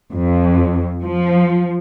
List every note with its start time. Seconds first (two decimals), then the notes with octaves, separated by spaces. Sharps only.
0.13 F2
1.05 F3